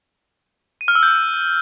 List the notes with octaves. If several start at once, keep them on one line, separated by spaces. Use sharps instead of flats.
D#7
F6
E6
G6